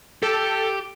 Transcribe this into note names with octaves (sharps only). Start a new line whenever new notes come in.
G4 A4